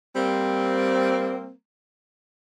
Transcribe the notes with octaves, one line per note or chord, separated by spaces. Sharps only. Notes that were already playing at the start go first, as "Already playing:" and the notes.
G3 A#3 C4